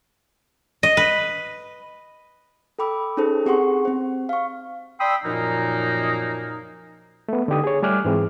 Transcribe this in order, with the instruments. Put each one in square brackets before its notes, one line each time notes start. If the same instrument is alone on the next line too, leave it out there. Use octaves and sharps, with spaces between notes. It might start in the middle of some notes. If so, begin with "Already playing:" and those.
[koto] D#5
B4
[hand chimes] A4 G5 B5 D6 E6
C#4 D#4 G#4 A4 C5
C4 G4 G#4 F#5 C6 C#6
C4 C5
F5 C#6
[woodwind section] D5 G5 B5 C6 D#6 E6
F#2 A#2 F3 A#3 D#4
[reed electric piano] A3 B3
D3 D#4 G4 D#6
G#4 C#5
G3 A3 G#5 D6 F6 F#6
G#2 E3 C4 G#4